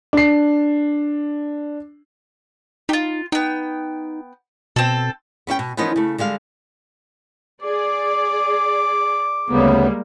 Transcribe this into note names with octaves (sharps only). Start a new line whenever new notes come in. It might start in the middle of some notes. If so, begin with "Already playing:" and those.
D4 C7
D#4 F4 G4
B3 D#4 G5
B2 C4 A4
B3 C#4 E4 G5
B2
E3 F3 A#3 B3 C#4 D#4
C#3 A3
D3 G3 G#3 F5
G#4 D5 D6
D2 C#3 G3 G#3 A#3 B3